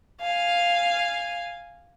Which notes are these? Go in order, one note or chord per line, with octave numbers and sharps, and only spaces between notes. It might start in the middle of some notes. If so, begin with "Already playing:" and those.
F5 G#5